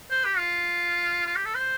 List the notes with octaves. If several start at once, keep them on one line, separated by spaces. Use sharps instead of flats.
C5
G4
F4
F4
G4
A4
C5